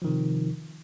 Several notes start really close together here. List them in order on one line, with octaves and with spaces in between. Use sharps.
F3 D#3 C3